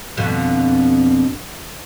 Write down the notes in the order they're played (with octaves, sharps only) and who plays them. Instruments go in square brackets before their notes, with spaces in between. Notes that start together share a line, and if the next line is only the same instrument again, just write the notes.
[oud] F2 B2 D3